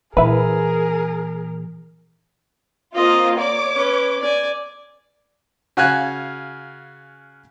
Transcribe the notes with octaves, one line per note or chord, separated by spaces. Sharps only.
A#2 E3 E4 G#4 A#4 B4
A#3 C4 F4 D#5
C#5 D5 D6
C#4 B4
D5 G#5
C#3 F#4 F5 G#5 F#6